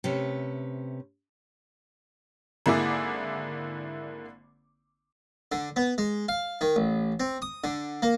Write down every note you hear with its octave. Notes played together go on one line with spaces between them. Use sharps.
C3 A3 C#4 B4
G#1 D3 A#3 E4 G#4 D6
D3
B3
G#3
F5
D#3
A1
C4
D#6
D3
A#3